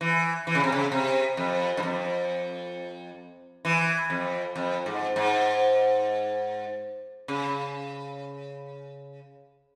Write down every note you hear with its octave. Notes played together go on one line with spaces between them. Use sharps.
E3
E3
C#3
C3
C#3
C3
F2
G2
F2
E3
F2
F2
G#2
G#2
C#3